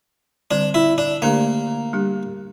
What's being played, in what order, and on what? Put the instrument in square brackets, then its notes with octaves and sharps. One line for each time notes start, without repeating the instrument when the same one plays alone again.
[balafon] D3 G3 C4 [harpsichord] D4
[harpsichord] E4
D4
[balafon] D3 A3 D4 G4 [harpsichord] A#3
[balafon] G3 D4 G4